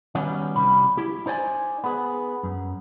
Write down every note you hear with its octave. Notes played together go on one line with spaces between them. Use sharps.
D#3 F#3 G3 B3 C#4
C2 G3 B5
E4 G4
D#4 C5 D5 G#5
B3 G#4
F#2